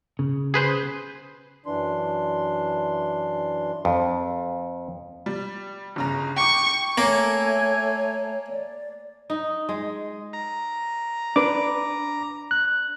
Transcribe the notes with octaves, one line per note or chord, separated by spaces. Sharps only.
C#3
G#4 B4 C5
F#2 E3 D4 C6
F2
G3
G1 C#3 A#5
G5 C#6 D6
A3 A#3 C#5 G#5
D5
D#4
G#3
A#5
D4 B4 D6
F#6